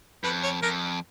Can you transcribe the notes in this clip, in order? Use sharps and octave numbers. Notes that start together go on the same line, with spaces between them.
F2 B4
C#5
F2 A#4